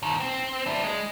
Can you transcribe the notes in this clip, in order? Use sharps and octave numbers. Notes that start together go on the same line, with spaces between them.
B2 D#3
C4
D4 E4
G#3